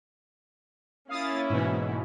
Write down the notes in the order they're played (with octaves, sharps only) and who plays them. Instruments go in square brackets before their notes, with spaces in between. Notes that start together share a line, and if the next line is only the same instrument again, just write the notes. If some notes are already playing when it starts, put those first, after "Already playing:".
[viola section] A#3 C#4 E4 [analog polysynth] F5 D#6 A6
[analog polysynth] G#2 B2 E3